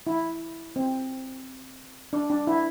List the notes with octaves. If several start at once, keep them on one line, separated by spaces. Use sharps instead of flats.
E4
C4
D4
D4
E4